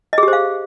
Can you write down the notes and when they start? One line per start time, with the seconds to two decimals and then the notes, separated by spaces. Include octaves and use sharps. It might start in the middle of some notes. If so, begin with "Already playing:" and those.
0.13 D#5
0.18 G#4
0.23 G4
0.28 C5
0.33 F5